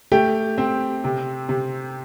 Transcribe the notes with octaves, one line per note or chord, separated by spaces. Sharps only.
A3 G4 G5
C4
C3
C3